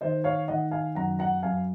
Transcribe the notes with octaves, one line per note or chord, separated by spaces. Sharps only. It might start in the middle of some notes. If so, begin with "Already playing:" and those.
D#3 C5 D#5
C#5 F5
D#3 D#5 F#5
F5 G#5
F#2 F#5 A#5
F#5 A#5
F#2 F5 G#5